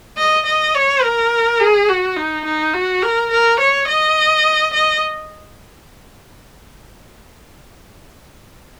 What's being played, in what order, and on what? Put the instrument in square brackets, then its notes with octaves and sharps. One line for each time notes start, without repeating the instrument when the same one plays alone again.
[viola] D#5
D#5
C#5
A#4
G#4
F#4
D#4
D#4
F#4
A#4
A#4
C#5
D#5
D#5